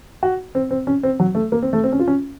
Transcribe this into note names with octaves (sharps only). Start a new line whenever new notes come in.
F#4
C4
C4
C#4
C4
F#3
A3
A#3
C4
A3
C4
C#4
F4
C#4